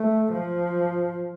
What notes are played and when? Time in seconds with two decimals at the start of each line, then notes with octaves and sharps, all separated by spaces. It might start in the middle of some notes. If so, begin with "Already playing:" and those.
Already playing: A3
0.32 F3